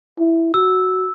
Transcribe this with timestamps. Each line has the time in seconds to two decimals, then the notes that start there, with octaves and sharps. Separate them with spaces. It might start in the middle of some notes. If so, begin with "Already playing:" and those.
0.19 E4
0.54 F#4 E6